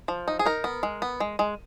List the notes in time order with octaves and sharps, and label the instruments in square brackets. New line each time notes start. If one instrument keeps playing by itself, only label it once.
[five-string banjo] F3
D#4
G#4
D#4 A#4
B3
G#3
B3
G#3
G#3